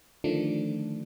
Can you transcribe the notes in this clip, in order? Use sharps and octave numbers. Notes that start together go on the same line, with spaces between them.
D3 D#3 F3 A3 D4